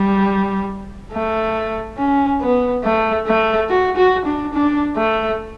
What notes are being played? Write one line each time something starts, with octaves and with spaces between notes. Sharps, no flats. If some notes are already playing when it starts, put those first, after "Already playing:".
Already playing: G3
A3
C#4
B3
A3
A3
F#4
F#4
D4
D4
A3